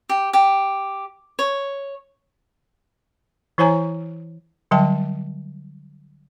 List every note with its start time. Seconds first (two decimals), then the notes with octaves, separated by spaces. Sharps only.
0.09 G4
0.33 G4
1.39 C#5
3.58 E3 E4 C5 C#5 G#5 A#5
4.71 D3 F#3 G3 G5 A5